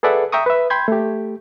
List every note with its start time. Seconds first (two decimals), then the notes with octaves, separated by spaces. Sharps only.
0.03 G#4 A4 B4 D5 E5 F#5
0.32 E5 G5 A#5 C#6 D#6
0.46 B4 E5
0.70 G5 B5 C6 G6 G#6
0.88 A3 G4